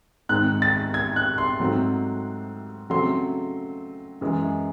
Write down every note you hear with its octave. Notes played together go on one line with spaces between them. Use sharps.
G#2 D#3 G#3 C4 F#6
A6
G#6
F#6
C6
G#2 F#3 A3 C4
C#3 F#3 A3 C4 C6
F#2 E3 G#3